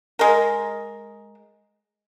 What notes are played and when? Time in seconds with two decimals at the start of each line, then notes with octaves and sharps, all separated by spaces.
0.19 G#3 A#4